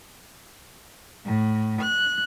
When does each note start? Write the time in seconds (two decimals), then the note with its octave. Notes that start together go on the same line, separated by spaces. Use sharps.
1.26 A2
1.82 F#6